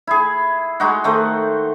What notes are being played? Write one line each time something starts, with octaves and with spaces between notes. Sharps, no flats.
E4 G#4
G#3 D#4 F#4
D#3 A3 C5